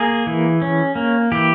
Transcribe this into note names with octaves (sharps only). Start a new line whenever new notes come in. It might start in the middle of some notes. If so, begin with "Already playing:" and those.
Already playing: A#3 G#4
E3
C#4
A#3
E3 G4